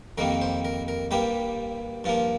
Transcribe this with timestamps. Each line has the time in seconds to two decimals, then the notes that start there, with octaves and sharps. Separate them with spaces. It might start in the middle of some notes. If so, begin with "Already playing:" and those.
0.18 F2 D#3 G3 A#3 A#4
0.42 C5
0.65 A#4
0.88 A#4
1.11 G2 G3 A#3 G4
2.04 G2 F3 A#3 F4